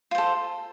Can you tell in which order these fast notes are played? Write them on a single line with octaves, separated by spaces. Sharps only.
F4 C5 A4